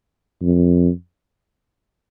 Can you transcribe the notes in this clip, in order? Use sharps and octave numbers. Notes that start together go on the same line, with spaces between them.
F2